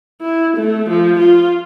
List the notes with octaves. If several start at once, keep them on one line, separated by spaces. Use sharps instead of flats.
E4
A3
F3
F4